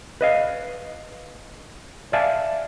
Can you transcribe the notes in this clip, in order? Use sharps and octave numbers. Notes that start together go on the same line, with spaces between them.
B4 D#5 F5
D5 E5 F5 G#5 A5